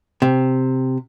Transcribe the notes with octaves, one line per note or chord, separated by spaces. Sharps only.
C3